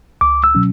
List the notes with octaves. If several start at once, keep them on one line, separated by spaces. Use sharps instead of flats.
C#2 D6
E6
B2 F#3 C#4